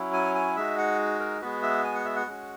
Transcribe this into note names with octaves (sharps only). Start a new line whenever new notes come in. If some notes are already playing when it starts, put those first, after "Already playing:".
Already playing: F#3 C#4 E4
G#5
G#5
G#3 D#4 F#4 E5
F#5
A#4
G#3 B3 F#4 B4
E5
G#5
F#5
E5
F#5
G#3 C#4 F#4